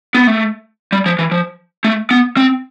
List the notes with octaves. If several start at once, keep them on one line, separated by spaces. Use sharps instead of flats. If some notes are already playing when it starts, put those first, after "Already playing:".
B3
A3
G3
F3
E3
F3
A3
B3
C4